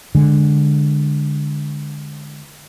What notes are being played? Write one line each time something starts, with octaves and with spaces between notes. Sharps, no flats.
D3 G#3